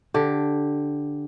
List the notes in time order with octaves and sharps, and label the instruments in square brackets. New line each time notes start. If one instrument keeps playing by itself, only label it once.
[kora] D3 G4